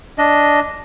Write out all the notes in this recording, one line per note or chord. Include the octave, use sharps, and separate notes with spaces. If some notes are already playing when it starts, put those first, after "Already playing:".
D4 D#5